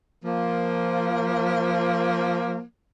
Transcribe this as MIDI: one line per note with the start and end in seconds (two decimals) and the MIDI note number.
0.25 2.62 53
0.25 2.62 58